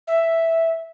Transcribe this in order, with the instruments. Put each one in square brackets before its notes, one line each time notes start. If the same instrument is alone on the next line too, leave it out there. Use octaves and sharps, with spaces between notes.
[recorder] E5